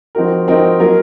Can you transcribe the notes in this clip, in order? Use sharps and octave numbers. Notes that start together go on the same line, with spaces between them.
F3 C4 D#4 F#4 A#4
F3 C4 D#4 F#4 A#4
F#3 A#3 F4 A#4